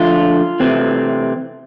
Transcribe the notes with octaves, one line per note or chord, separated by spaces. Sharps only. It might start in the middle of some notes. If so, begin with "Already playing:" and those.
Already playing: D3 F3 A3 D4 F4
C3 E3 A3 C4